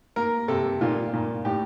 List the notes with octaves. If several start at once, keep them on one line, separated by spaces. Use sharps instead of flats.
A#3 A#4
C3 A4
A#2 F4
A#2
A2 G4